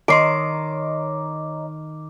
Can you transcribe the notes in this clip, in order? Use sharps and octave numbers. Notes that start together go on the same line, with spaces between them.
D#3 C#5 D#5 A#5 C6 D6 C7 D7